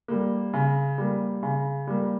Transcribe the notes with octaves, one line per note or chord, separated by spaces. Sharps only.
G3 A#3
C#3
G3 A#3
C#3
G3 A#3